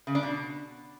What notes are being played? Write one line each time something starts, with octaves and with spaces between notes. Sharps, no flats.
C#3
D4
B2